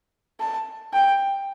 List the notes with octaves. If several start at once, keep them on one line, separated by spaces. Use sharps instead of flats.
A5
G5